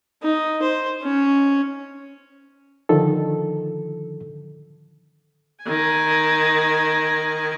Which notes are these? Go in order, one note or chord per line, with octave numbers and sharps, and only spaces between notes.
D#4
C5
C#4
D3 D#3 F3 A4
D#3 G#5